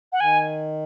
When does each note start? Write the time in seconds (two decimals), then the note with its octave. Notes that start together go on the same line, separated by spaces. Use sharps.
0.13 F#5
0.20 D#3 G#5